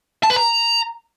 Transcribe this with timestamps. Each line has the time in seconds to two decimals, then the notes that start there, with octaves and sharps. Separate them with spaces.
0.23 A5
0.30 B4
0.36 A#5